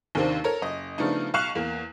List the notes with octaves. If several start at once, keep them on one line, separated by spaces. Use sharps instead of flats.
D#2 C3 D#3 A#3 C4 D4
A4 A#4 C#5
F#1 D#5
C#3 F3 A3 B3 D4 D#4
B1 F5 C#6 F#6 E7 F7
E2 A#3